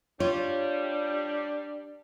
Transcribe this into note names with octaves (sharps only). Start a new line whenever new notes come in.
G3 D4 F4 C#5